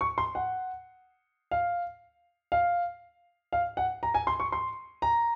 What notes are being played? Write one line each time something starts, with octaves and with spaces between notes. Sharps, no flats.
C#6
C6
F#5
F5
F5
F5
F#5
A#5
G#5
C6
C#6
C6
A#5